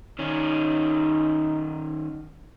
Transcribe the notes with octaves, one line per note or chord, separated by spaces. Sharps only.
D#3 C#4 D#4